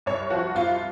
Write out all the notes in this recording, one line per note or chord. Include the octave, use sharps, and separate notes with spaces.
C2 C#5
F3 F#4
C2 F4